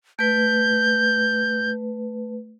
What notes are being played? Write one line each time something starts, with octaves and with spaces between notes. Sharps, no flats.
A3 B4 G6